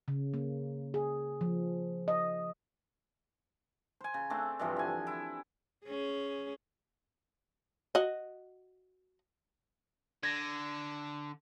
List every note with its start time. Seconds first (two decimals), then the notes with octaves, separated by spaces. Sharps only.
0.08 C#3
0.34 A#3
0.94 G#4
1.41 F3
2.08 D#5
4.01 C5 G#5
4.14 C#3
4.30 A3 C4 D4
4.59 G2 C3 E3 F3
4.76 D3 G#5
5.07 E4
5.86 C#4 G#4
7.95 F#4 D#5
10.23 D3 G#6 A#6